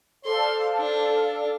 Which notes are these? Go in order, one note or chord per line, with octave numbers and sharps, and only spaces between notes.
A4 C5 D5 F5 C6
D4